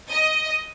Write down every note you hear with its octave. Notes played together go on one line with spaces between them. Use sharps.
D#5